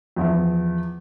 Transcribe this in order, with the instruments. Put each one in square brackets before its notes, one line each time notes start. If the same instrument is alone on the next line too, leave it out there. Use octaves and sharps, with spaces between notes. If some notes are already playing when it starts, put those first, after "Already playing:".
[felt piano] E2 F3 E5